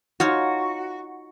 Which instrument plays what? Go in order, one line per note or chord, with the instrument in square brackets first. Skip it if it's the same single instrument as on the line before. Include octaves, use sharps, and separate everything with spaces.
[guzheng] D#4 F4 C#5 [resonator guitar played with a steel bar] F#4